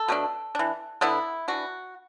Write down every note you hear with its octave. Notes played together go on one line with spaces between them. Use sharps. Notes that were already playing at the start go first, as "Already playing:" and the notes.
Already playing: A4
B2 A3 D4
E3 D4
D3 B3 D4 E4
E3 D4 F#4